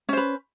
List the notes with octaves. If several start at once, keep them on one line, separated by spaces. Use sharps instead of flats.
C#4 B4 C5